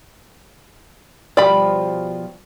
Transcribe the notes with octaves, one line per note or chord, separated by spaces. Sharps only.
B2 F3 G3 D5 B5